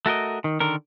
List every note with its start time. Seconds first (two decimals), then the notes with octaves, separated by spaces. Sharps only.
0.06 A3 F#4 A#4 D#5
0.44 D#3
0.60 D3 D#3 A#4